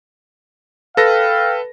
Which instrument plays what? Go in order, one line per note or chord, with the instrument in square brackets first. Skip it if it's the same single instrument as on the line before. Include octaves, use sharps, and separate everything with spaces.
[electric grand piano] A4 B4 A#6 [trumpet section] F5 G5